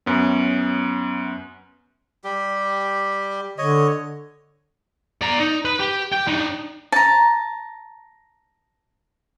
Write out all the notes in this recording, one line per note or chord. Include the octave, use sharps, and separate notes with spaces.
F#2 B3 C#4
G3 G4
D3 C#5 D#5
D5 A#5
D#4
B4
G4
G4 G5
D4 D#4
A5 A#5